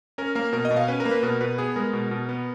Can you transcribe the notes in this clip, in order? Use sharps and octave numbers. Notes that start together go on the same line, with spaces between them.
C#4 A#4
A#3 A#4
B2 A#4
D#5
B2
F5
C#4 B4
A#4
A#3
B4
B2 A#4
B2 B4
B3 G#4
G#3 A#4
B2
B2
B3